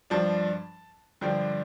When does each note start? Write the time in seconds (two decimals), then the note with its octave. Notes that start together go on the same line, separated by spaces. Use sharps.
0.10 G2 F3 D4 A5
1.21 G2 D3 F3 D4 G5